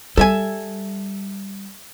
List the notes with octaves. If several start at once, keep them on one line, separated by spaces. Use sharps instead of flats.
G3 A4 E5 G#5